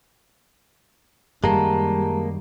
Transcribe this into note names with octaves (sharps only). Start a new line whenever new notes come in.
F#2 D#3 G3 G#3 A#3 G4 A5 A#5